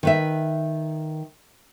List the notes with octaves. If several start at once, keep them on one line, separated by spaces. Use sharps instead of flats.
D#3 B4 E5